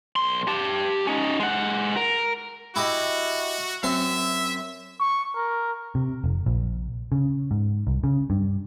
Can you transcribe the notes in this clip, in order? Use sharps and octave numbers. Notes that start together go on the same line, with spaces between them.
B1 C6
G4 A5
C#4 D#4
G#3 F#5
A#4
E4 F#4 G4 D#5
F#2 C4 E5 C6
C#6
A#4
C3
F1
A#1
C#3
G#2
C2
C#3
G2